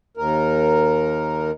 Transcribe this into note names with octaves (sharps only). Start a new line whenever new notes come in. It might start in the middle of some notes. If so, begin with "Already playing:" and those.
D#2 A#4